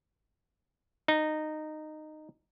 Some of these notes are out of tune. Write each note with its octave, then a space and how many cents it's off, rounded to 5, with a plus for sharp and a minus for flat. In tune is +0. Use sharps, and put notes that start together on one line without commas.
D#4 -15